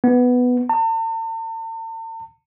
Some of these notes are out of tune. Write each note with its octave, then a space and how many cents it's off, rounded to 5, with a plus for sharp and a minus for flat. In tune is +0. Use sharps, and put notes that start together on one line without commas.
B3 +5
A5 +45